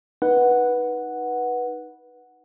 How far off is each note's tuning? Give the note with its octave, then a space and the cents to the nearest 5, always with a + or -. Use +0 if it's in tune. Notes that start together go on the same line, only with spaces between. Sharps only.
D#4 +5 B4 -15 F#5 +0